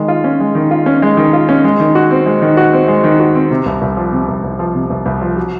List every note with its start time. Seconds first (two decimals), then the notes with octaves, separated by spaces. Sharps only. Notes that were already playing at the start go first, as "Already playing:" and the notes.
Already playing: D#3 G#3
0.08 F4
0.24 C#4
0.40 G#3
0.55 D#3
0.71 F4
0.86 C#4
1.02 G#3
1.17 D#3
1.33 F4
1.49 C#4
1.64 G#3
1.80 D#3
1.95 F#4
2.11 C4
2.26 G#3
2.42 D#3
2.57 F#4
2.73 C4
2.88 G#3
3.04 D#3
3.19 F#4
3.35 C4
3.51 C3
3.66 C2
3.82 C2
3.97 F3
4.13 C3
4.28 C2
4.44 C2
4.59 F3
4.75 C3
4.90 C2
5.06 C2
5.22 F3
5.37 F#3